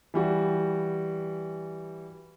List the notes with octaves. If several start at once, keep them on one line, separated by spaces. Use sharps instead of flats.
E3 G3 F#4